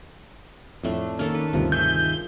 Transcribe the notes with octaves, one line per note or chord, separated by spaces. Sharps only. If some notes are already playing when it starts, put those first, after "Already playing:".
F2 A2 A3 D4 E5
D#3 A#3 C#4 A4
B4
G1 D2 C3 F3
D#3 G#4 C#5 E5 G6